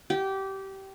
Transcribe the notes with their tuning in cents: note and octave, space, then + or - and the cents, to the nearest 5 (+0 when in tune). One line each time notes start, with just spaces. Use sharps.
G4 -20